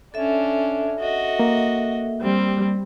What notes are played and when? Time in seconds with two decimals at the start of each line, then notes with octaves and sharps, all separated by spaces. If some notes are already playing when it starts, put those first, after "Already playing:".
0.14 C#4 D4 A4 E5
1.00 F#4 D#5
1.39 A#3
2.21 G3 C4